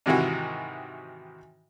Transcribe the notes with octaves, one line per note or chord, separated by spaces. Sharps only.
G#2 C3 D#3 E3 E4 F#4